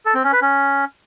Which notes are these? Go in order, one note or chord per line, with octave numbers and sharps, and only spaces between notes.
A4
C4
C#4
B4
C#4